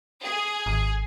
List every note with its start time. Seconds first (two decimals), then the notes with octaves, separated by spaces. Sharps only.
0.22 G#4
0.66 G#1